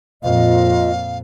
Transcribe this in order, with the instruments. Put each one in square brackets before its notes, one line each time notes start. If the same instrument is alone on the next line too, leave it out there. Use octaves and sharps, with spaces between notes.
[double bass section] F2 A#2 [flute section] F4 D#5 [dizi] F5